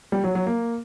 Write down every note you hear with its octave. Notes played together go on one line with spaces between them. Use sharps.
G3
F#3
F#3
A#3